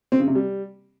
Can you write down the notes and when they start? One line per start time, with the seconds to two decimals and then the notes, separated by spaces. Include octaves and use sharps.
0.12 C4
0.20 C#3
0.27 C3
0.35 G3